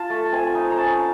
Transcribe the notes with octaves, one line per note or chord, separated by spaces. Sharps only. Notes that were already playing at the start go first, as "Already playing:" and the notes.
Already playing: F4 A5
A3
C4 G#5
D#4
A#5
C#4 A5